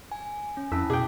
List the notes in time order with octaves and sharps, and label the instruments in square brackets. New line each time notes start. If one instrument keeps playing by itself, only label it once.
[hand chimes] G#5
[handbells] C#4
[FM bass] F2 [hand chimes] C#4 A5 B6 [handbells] E4 [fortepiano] E6
[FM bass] B2 [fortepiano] G#4 G5 [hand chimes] D6